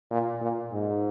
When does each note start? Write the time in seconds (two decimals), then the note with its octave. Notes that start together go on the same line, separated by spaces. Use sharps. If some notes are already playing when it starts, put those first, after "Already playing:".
0.11 A#2
0.41 A#2
0.72 G#2